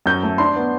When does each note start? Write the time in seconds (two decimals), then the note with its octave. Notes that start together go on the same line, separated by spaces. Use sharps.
0.06 F#2 G6
0.23 A3
0.38 D4 C6
0.56 B3